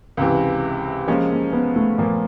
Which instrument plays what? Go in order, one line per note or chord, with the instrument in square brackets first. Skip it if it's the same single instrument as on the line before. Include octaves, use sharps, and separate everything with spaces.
[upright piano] C#2 C3 E3
[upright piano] F3 G#3 C#4 [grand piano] A#3
[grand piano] A#3
B3
A3
[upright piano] A#2 F3 A#3